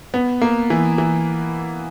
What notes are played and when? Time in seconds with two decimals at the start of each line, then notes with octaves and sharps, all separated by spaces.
0.14 B3
0.41 A#3
0.70 E3
0.98 E3